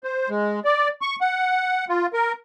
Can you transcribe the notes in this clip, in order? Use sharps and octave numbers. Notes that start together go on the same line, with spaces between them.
C5
G#3
D5
C#6
F#5
F4
A#4